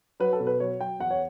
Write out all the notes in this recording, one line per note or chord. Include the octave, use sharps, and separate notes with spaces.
F#3 B4
A4
B2
B4
F#3 C#5
F#3 G5
E2 F#5
C#5